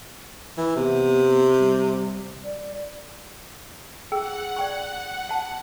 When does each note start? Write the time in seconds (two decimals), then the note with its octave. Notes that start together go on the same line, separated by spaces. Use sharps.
0.58 E3
0.76 C3 B3
1.58 G3
2.44 D5
4.12 G#4 F#5 G5 E6
4.56 D5 G5 C#6
5.29 F#5 A5